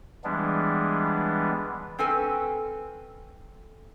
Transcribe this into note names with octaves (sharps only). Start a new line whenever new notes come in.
E3 G3 G#3 B3 D4
C4 C#4 A4 B4 G#5